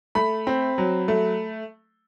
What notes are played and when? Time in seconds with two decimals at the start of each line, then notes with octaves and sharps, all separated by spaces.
0.15 A3 B5
0.47 C4
0.78 F#3
1.08 A3